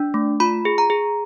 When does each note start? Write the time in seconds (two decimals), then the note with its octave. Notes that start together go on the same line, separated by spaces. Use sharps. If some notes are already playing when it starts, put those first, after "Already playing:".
Already playing: D4
0.14 A3
0.40 F4 B5
0.65 G#4
0.78 A#5
0.90 G#4